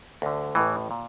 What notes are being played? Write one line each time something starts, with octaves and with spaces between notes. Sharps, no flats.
D2 D3
A1 A2 E3
A#2